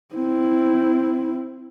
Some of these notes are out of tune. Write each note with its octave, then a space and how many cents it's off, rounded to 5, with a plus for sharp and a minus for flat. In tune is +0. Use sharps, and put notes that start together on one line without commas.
C4 -10 E4 +0